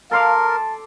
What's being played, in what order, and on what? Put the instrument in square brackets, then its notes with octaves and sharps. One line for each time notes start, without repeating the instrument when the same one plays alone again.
[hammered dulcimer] A4 C6 D6 [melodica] A#4 [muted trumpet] F5
[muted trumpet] A5